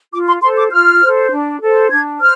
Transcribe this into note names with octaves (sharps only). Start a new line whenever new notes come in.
F4 D6
C6
A4 C5 C6
D6
F4 F6
A4 C5
D4
A4 C5
D4 G#6
C5 F6